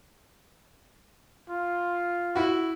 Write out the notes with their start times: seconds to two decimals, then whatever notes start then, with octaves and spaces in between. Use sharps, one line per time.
1.49 F4
2.36 E4 F#4